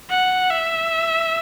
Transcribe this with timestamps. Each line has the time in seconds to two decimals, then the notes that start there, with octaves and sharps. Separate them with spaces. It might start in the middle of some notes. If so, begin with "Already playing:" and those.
0.10 F#5
0.50 E5